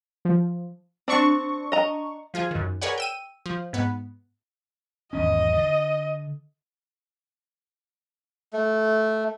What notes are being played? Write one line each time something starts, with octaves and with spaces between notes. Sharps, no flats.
F3
C4 D4 C#6
D#5 A#5
F3 F4 G#4 G#5
F#2 D#3
G#4 A#4 B4 C#5 D5 F#5
G5 E6 D#7
F3
G#2 B3
G#1 E2 C#4 D#5
D3
A3